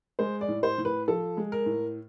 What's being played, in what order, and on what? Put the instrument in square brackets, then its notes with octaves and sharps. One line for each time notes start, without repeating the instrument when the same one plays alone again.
[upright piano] G#3 C5
D5
A2
C5
A2
B4
F3 A4
G#3
A#4
A2